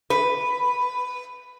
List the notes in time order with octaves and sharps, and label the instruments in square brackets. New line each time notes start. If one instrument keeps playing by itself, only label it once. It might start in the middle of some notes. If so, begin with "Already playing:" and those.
[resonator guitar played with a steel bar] B4